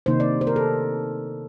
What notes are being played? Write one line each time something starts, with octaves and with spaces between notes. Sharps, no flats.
C3 D#3 A#3 D#4 C5
D5
C5
A#4
A4